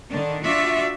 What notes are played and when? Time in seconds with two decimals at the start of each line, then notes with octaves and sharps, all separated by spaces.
0.10 D3 D#3 D4
0.44 D4 F4 F#4 D5 E5